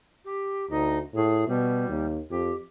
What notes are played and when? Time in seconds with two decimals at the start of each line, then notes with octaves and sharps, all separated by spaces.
0.25 G4
0.70 D2 D#4
1.15 A2 G#4
1.47 B2 G3
1.88 D#2
2.30 F2 G4